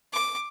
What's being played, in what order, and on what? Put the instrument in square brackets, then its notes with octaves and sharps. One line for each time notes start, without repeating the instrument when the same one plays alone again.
[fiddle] D6